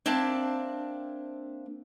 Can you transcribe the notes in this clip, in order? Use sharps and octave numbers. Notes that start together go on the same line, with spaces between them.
A#3 C4 D4 E5 A5